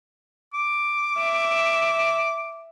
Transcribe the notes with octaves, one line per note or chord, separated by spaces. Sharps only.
D6
E5